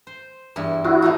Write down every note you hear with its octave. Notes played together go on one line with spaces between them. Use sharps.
C5
E2 G2 E4
E4 F#4 G#4
F3 A3 D#4